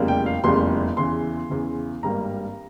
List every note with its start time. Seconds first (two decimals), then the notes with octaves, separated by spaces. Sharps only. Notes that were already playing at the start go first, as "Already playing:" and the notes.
Already playing: F1 E2 C#3 G3 A#3
0.08 G5
0.26 F5
0.44 F1 E2 C#3 G3 A#3 C6
0.97 E2 C#3 E3 C6
1.50 E2 C#3 E3
2.03 G#1 G2 G3 A#3 A#5